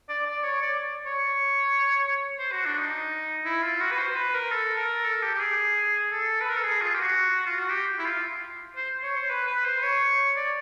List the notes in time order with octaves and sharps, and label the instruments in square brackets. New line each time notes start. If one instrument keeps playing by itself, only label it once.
[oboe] D5
D5
C#5
D5
C#5
C5
F#4
D4
D#4
E4
F4
F#4
B4
C5
B4
A#4
A4
A#4
A4
G4
G4
G#4
A4
B4
A#4
A4
G#4
F4
G4
F#4
F4
F#4
G4
E4
F4
C5
C#5
C5
B4
B4
C5
C#5
D5